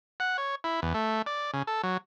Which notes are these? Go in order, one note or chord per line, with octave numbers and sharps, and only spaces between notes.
F#5
C#5
E4
E2
A3
D5
C#3
A4
F#3